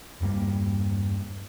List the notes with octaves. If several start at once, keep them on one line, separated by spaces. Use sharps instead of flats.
E2 G2 G3 A#3